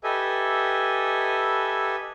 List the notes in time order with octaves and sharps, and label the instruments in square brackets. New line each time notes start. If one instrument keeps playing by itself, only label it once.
[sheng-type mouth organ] G4 A4 B4 D#5 E5 G#5